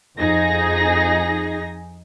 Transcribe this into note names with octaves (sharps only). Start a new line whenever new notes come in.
F2 D#4 G#4 A#6